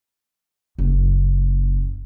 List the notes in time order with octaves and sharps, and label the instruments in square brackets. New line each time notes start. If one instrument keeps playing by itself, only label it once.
[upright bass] F#1